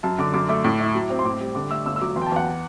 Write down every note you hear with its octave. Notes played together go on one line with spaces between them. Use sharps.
F#2 A5
D3 D6
F#2 D6
A3 D6
A2
E4
F#3
C4
C6
A2 D6
G3
D3 D6
A3 E6
G1 E6
E6
F#3 D6
E2 C6
G5
A5
E2 F#5